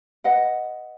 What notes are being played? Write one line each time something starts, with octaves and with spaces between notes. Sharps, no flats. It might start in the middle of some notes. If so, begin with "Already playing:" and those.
B4 D#5 F#5